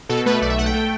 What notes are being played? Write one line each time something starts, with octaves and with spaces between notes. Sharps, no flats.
B2 A4
A3 B4
B1 D5
E5
A3 F#5
G5
A3